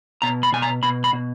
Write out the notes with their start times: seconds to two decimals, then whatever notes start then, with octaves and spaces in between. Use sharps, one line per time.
0.22 B2 A#5
0.43 B5
0.53 B2 G#5
0.62 A#5
0.83 B2 B5
1.04 B5
1.13 B2